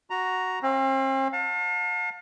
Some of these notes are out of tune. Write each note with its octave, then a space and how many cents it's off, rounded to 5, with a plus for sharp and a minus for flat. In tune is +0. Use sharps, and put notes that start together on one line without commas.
F#4 +0 A#5 +0
C4 +45 F5 +0
F5 +40 A5 +25